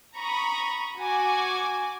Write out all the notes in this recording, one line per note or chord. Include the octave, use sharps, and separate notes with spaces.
A#5 B5 C#6 D#6
F#4 G#5 D6